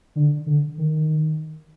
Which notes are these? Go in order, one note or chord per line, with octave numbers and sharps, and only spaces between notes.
D3
D3
D#3